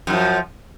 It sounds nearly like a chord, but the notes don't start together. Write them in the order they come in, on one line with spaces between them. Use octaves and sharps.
F#2 D#3 F3